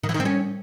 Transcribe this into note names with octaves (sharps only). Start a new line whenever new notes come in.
D#3
E3
D#3
C4
C#4